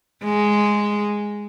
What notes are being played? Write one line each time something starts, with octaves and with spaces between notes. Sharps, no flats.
G#3